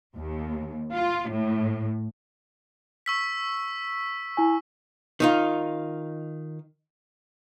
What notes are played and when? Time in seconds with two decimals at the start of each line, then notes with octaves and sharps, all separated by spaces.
0.16 D#2
0.93 F4
1.29 A2
3.06 C#6 E6 B6
4.37 E4 G#5
5.20 D#3 D#4 F4